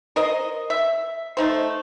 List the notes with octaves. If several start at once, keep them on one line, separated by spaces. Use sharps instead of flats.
A#4 C5 D#5
E5
A3 D#4 C5